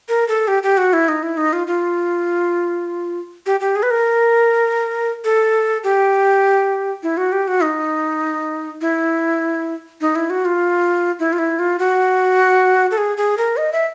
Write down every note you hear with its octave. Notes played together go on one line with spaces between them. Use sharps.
A#4
A4
G4
G4
F#4
E4
D#4
E4
D#4
F4
F4
G4
G4
G#4
B4
A#4
A4
G4
E4
F#4
G4
F#4
D#4
E4
D#4
E4
F#4
F4
E4
F4
E4
F4
F#4
A4
G#4
G#4
A#4
D#5
E5